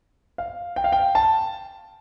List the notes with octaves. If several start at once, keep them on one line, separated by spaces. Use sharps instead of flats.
F5
G5
F5
G5
A5